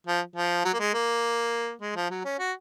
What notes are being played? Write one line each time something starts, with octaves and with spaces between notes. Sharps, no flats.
F3
F3
F#3
A#3
G#3
A#3
G#3
F3
F#3
C#4
F#4